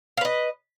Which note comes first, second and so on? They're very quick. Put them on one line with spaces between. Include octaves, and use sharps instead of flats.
F5 B4 D#5